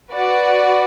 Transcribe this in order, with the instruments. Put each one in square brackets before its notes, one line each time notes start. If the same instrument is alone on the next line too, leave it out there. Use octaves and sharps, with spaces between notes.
[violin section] F#4 B4 D5 F#5